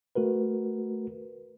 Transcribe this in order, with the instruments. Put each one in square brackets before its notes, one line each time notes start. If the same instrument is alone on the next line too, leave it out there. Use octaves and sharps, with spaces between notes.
[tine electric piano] A3 F#4 A#4 B4